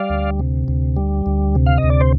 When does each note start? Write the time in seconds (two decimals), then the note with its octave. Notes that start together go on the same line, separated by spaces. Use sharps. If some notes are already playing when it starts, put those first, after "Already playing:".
Already playing: G3 D5 F5
0.10 D2
0.39 C3
0.68 D2
0.97 G3
1.26 D2
1.55 C3
1.66 F5
1.78 D#5
1.83 D2
1.90 D5
2.01 C5